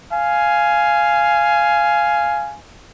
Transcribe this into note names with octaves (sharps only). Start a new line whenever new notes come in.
F5 G#5